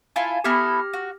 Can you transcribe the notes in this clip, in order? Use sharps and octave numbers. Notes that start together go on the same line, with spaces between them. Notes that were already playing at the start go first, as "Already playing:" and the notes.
E4 F4 A4 G#5
B3 E4 G4 A4 F6 A#6
F#4